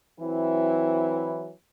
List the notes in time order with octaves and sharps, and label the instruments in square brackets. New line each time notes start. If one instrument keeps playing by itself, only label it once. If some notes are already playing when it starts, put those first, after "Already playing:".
[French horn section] E3 F#3 C4 E4